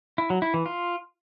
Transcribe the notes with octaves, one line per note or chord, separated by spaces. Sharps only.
E4
F#3
E4
E3
F4